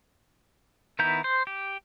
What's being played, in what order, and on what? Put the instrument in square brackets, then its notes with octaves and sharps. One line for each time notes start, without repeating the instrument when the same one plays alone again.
[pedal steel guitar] D#3 B3 E4 A#5 G6
C5
G4